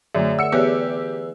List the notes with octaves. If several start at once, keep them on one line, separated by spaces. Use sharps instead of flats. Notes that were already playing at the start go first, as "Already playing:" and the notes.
F#2 D3 A3 G#4 D5 E5
A#4 F#5 E6 C#7
E2 B3 G4 C#5 F#6